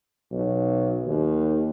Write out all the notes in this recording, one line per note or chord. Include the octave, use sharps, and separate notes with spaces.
B1
D#2